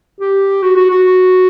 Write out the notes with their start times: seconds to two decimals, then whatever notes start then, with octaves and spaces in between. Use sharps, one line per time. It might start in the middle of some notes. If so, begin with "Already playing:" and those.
0.21 G4
0.63 F#4
0.77 F#4
0.91 F#4